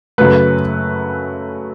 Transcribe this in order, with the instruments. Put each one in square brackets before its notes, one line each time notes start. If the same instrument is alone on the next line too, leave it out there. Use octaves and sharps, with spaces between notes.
[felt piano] F#2 C#3 F#3 A3 B4